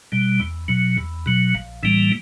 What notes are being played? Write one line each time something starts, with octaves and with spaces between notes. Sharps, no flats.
B2 G3
E2
B2 F#3
E2
B2 F#3
A#1
A2 E3 G3 A#3